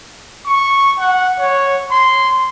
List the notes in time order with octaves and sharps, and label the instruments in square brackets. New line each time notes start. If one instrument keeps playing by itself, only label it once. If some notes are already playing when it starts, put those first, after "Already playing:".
[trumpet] C#6
F#5
C#5
C6